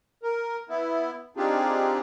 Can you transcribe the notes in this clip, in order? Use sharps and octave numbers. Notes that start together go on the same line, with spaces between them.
A#4
B3 E4
C4 D4 D#4 F4 G4 G#4